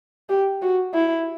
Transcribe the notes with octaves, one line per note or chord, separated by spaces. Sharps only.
G4
F#4
E4